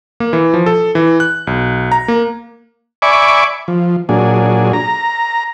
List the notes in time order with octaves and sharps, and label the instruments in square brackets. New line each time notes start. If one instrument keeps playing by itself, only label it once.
[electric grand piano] A#3
E3
F3
A4
E3
F#6
B1
A#5
A#3
[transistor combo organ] D5 E5 G#5 B5 C#6 D6
F3
A#2 F#3 D4 G#4
A#5